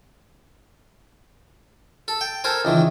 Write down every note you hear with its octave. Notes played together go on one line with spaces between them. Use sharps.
A4
G5
A4 A#4 C5 G#5
C#2 D#3 E3